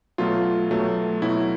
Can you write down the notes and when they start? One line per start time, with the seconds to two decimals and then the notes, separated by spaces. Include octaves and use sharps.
0.18 B2 F#3 A3 F4
0.71 B2 F#3 A3
1.22 B2 F#3 A3 E4